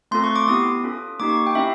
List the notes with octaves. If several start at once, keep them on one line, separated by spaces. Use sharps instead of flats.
A3 C4 F4 A4 C6
C#6
D6
B3 E4 G4 D#6
C#4 F4 A4
A#3 D#4 G4 D6
C#6
G5
C#4 E4 G4 E5